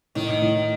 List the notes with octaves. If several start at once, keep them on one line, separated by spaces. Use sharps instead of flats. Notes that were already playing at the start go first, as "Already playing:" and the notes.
A2 D#3
A2